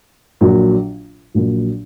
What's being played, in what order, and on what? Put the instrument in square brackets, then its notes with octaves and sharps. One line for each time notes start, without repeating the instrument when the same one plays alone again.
[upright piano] A#1 A#2 F#3
A#1 A#2 F#3